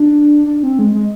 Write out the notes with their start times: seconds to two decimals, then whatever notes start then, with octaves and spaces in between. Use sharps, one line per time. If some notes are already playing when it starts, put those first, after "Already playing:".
Already playing: D4
0.47 D4
0.63 C4
0.79 G#3
0.94 G#3